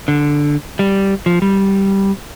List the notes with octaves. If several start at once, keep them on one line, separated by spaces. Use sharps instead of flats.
D3
G3
F3
G3